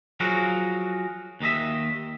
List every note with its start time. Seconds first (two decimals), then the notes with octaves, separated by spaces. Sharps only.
0.20 F3 F#3 F#4 G#4 A#4
1.40 D#2 D#3 D#5 E5